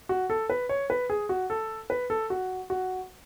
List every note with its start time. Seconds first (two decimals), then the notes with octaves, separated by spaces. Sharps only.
0.09 F#4
0.30 A4
0.50 B4
0.69 C#5
0.90 B4
1.10 G#4
1.29 F#4
1.50 A4
1.90 B4
2.10 A4
2.30 F#4
2.70 F#4